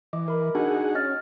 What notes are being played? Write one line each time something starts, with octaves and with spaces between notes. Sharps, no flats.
E3 D#5 D6
A#4 B5
D4 D#4 F#4 G#4 F#5
C#4 D#5 F6 A6